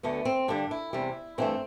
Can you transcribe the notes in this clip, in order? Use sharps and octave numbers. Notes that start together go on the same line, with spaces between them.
D2 D3 A3 B3
C4
G2 D3 G3 D4
E4
E2 C3 G3
G2 E3 A3 C4